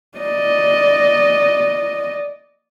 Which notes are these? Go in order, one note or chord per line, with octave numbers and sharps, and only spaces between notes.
D5 D#5